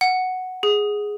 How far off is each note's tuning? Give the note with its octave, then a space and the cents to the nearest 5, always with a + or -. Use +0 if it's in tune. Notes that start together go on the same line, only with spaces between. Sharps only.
F#5 +0
G#4 +0